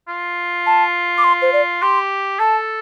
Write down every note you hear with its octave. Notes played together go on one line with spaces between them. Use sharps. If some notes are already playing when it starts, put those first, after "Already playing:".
F4
A5
D6
C6
C5
D5
G4 C6
A4 A5